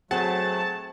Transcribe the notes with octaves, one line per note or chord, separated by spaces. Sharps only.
F#3 A3 C4 G#4 F#5 A5